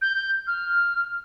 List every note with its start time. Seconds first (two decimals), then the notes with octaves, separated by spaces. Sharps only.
0.02 G6
0.47 F6